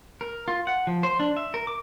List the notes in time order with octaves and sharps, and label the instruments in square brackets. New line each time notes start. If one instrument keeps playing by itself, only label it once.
[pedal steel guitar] A#4
F4
F#5
F3
C5
D4
E5
A#4
D6